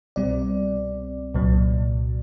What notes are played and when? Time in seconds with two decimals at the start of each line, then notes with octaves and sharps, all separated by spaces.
0.16 C2 B2 G3 C4 D5
1.34 C2 A#2 F#3